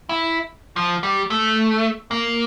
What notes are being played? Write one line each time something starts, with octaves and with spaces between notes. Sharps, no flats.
E4
F3
G3
A3
A#3